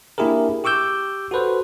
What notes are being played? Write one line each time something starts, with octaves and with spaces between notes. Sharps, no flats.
A#3 D4 E4 G4 G#4 A#4
G4 C#6 D6 E6 G6
F#4 A4 B4 C5